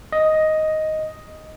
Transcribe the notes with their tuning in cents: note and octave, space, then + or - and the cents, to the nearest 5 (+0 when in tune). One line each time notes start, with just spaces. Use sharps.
D#5 +5